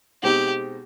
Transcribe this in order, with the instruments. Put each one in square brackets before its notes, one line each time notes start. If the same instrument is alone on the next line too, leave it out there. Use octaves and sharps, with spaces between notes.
[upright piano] B2 G#3 C4 D#4 [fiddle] G4